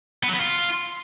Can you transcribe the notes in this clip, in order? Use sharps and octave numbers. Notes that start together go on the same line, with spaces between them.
B3
F#3
B3
F4